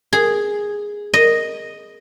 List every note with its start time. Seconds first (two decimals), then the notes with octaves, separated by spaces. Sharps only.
0.13 G#4
1.14 D#5